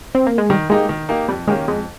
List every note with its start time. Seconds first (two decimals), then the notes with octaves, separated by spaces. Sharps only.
0.15 C4
0.27 A#3
0.38 G#3
0.50 D#3 G3
0.69 G#3 A#3 D#4 G4
0.89 D#3
1.09 A#3 D#4 G4
1.28 F2 G3
1.48 D#3 G#3 A#3 C#4 G4
1.68 F2 G#3